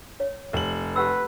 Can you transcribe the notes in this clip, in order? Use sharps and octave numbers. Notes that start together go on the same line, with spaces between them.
C#5
F1 F#7
G4 B4 F#5 E6